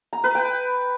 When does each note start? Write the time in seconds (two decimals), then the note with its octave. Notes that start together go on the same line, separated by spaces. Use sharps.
0.13 A#5
0.24 B4
0.35 G5